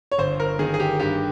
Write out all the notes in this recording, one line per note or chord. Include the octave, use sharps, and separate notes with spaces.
C#5
G1 C5
A#4
D#3 G#4
G#4
G4
G2 G4